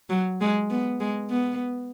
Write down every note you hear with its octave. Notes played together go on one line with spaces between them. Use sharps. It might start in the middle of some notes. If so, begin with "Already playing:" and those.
F#3
G#3
B3
G#3
B3